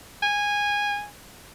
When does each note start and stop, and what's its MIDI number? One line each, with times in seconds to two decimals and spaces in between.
0.22 1.06 80